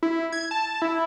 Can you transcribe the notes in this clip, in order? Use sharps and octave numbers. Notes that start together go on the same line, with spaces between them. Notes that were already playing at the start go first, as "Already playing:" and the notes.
E4
G#6
A5
E4